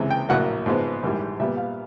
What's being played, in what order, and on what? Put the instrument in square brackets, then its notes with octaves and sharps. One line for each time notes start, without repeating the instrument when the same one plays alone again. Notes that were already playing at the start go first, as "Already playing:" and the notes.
Already playing: [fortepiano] C#2 C3 E3 G#3
G5
A#1 A2 F#3 A#3 F#5
G#2 F3 G#3 B3
A#1 G#2 E3 G3
A#2 G3 B3 E5
F5